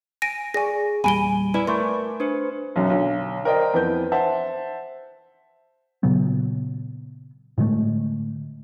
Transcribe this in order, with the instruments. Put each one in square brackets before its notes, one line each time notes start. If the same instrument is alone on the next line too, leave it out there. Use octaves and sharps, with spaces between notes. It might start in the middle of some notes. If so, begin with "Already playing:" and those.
[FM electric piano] G#5 [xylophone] A#6 D7 D#7
[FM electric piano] G#4 D5 C#6 [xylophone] G#5 A#6
[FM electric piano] E2 A#2 G3 [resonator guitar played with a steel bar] G#5 [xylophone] B5 D7 G7
[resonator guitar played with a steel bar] E4 [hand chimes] B4 D5
[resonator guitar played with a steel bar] A3 [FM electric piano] A#4 G#5 D6 [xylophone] C6
[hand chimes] D4 B4 C5
[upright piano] B1 F#2
B1 D3
A#4 C5 D5 D#5 G5
F2 E3 B3 G6
C5 E5 F#5 A5
[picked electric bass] A#2 C#3 F#3 B3
A2 D3 G#3 A3